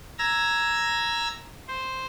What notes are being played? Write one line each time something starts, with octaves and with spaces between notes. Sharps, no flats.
A#5 E6 G#6 A#6
C5